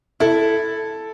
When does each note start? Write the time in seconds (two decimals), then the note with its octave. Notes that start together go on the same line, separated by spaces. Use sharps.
0.20 E4 A4